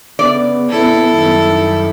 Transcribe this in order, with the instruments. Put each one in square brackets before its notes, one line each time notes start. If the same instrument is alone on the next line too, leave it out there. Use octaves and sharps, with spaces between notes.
[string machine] C#3 [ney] B3 [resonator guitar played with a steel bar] D5
[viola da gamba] E4 A4
[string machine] F#2 D#3 G3